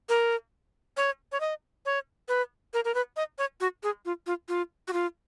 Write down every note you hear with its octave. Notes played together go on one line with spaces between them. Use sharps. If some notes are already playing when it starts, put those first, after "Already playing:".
A#4
C#5
C#5
D#5
C#5
B4
A#4
A#4
B4
D#5
C#5
F#4
G#4
F4
F4
F4
F#4
F4